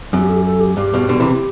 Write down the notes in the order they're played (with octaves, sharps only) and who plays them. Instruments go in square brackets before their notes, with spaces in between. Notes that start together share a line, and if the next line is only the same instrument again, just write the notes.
[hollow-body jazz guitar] F#2 [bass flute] C4
[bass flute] G4
A4
G4
A4
G4
[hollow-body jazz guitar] G2 [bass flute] G4
[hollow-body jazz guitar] G2 B2
B2 D3
C3 E3